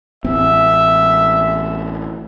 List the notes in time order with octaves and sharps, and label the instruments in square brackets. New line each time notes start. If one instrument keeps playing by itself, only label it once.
[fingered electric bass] A1 C4 [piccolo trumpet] E5